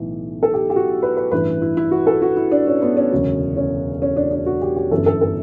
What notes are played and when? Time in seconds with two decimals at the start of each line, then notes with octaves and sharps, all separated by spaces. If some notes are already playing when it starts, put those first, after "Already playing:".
Already playing: B1 A2 E3
0.43 A4
0.54 G4
0.70 G4
0.76 F#4
1.03 B4
1.17 B4
1.31 A1 G2 E3 B4
1.62 E4
1.77 E4
1.91 F#4
2.07 A4
2.22 F#4
2.37 E4
2.52 D4
2.67 C#4
2.82 B3
2.97 C#4
3.12 E1 D2 C#3 F#3
3.57 C#4
4.02 C#4
4.17 D4
4.31 D4
4.46 F#4
4.62 G4
4.76 G4
4.91 G1 F#2 E3 A4
5.06 A4
5.21 A4